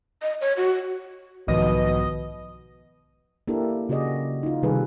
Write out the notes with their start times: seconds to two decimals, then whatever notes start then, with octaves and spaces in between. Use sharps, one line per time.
0.22 D#5
0.41 C#5
0.57 F#4
1.48 B1 G#2 B2 D#3 F3 D#5
3.48 A#3 D4 E4 G4 A4 A#4
3.89 C#3 F#4 G#4 D5 D#5
4.43 D#4 F4
4.63 C3 D#3 G3 G#4 A4 B4